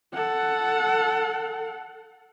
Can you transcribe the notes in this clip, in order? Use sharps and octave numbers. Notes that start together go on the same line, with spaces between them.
A4 F#5